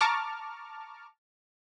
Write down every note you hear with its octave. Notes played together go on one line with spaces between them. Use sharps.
A5 A#5 C#6 D6 F6